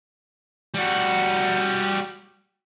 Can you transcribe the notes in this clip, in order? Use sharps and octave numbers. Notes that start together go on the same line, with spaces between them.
G3 F#4